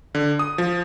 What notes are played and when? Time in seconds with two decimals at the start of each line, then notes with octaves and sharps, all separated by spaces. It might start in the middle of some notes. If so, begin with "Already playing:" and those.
0.15 D3
0.39 D#6
0.58 F3